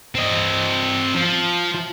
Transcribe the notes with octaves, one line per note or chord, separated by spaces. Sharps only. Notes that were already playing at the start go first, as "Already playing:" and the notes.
C4 D#5
F3